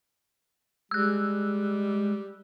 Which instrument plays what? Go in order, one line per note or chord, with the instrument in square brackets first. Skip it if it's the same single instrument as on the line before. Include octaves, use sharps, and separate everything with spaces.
[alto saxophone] G3 [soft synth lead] G#3 [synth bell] E6 F#6